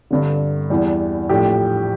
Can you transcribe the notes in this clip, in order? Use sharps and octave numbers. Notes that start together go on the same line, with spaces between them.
G1 G2 D3
E2 E3 G3
A#1 A2 F3 G4